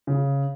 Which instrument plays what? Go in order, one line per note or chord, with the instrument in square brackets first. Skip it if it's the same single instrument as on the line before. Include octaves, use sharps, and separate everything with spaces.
[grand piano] C#3